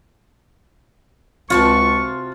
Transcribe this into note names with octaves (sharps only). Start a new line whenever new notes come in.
C#2 C3 F4 F#4 A5 C#6